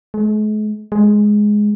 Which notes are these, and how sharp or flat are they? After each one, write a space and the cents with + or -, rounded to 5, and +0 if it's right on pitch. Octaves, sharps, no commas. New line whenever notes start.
G#3 +45
G#3 +5